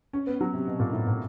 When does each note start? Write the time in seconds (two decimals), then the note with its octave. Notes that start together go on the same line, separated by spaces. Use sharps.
0.13 C#4
0.27 B3
0.41 F#3
0.54 C3
0.67 B2
0.80 A#2
0.93 A2
1.07 A#2